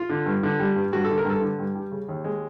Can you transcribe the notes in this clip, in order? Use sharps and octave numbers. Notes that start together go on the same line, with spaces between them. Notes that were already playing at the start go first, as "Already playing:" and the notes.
Already playing: F4
D3
G2
D3
G3
G2
G2 F#4
D3 A4
A#4
G2 A4
D3
G2
G3
C#3
D#2
G#3